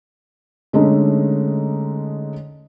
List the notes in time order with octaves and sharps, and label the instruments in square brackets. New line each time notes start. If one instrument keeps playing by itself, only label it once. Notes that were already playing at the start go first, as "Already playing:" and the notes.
[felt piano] D3 G#3 A3 C#4 D#4